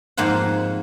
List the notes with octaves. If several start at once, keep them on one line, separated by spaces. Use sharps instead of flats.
F2 G#2 A#3 C5 F#5